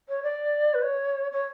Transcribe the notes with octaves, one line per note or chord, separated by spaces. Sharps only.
C#5
D5
B4
C#5
C#5